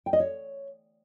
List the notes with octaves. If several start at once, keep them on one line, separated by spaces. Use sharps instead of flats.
G5
D#5
C#5